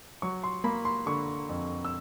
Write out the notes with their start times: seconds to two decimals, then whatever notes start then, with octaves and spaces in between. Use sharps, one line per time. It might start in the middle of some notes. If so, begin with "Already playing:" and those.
0.22 F#3 C#6
0.44 C6
0.64 A#3 B5
0.85 C6
1.06 D3 C#6
1.49 F2
1.85 E6